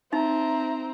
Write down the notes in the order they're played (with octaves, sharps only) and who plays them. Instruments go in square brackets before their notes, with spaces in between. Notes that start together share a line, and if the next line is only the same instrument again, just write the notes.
[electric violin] C4 [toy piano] D#4 [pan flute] E5 [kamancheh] A#5